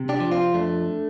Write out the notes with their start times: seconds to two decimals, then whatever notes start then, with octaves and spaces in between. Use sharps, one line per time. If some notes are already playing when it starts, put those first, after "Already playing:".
Already playing: C3
0.09 D4 G4
0.20 F3
0.32 C4 F4
0.54 F2 A3 D4